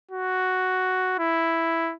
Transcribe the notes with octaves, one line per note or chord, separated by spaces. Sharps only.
F#4
E4